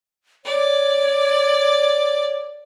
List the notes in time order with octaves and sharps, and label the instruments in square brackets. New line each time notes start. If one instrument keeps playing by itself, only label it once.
[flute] C#5 [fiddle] D5